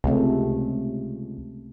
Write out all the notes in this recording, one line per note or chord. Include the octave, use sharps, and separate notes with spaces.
C#2 C3 A3